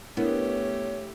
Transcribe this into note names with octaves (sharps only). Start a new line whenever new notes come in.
A3 B3 D4 E4 G4 A#4 C#5